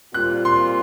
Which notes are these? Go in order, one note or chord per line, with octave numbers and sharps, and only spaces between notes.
A#2 G3 C4 F4 F#6
C6